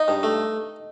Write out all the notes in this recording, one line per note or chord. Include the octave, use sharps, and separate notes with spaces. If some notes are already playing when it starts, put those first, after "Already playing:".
Already playing: D#4
G2
A3